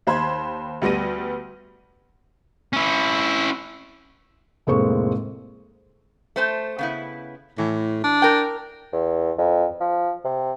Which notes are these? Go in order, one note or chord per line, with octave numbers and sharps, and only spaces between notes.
D#2 C5 B5 G#6
D2 G3 B3 A#6 D#7
C#4 E4
F1 A2 G#3 A#3 C4 C#6
A3 C5 A5
C#3 B3 E4
A2 E3
D4
A#4 G5
E2
F2
F3
C3